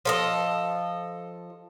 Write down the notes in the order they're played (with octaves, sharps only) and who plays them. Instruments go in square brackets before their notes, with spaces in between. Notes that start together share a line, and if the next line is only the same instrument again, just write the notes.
[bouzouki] F3 A4 D#5